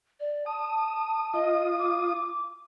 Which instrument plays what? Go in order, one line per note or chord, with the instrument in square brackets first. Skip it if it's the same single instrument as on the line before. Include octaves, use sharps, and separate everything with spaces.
[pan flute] D5
[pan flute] A5 [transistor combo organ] D#6
[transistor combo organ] F4 D#6 [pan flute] D#5
[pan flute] D6